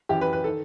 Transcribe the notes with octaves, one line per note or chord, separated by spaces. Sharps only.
F#2 E3 G4
B4
B4
D#3 A4